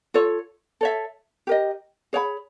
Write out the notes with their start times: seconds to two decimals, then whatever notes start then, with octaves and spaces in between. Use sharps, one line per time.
0.14 F4 A4 C#5
0.81 A4 C#5 E5
1.47 G4 A#4 D#5
2.13 G#4 C#5 F#5 B5